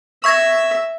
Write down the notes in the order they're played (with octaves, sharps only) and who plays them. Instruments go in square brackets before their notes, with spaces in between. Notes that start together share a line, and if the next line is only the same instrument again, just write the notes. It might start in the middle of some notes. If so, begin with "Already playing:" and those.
[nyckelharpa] E5 [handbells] C#6 G#6 A#6